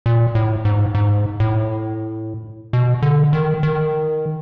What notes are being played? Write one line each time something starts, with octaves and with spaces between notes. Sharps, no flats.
A#2
A2
G#2
G#2
A2
B2
D3
D#3
D#3